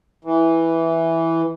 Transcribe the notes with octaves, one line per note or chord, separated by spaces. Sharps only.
E3